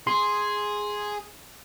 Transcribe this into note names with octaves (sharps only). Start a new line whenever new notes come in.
G#4 C6